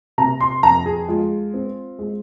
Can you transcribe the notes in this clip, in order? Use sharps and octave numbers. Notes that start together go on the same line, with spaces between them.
C3 A#5
C6
F2 A#5
G#4
G#3 F4
C4
G#3